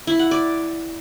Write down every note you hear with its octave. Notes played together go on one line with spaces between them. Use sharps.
E4
F#5
D5